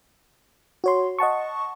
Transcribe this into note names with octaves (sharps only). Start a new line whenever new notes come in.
F#4 C#5 C6
D#5 F#5 A5 C#6